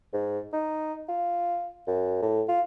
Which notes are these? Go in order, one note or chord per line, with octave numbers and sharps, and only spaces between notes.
G#2
D#4
F4
F#2
A2
F4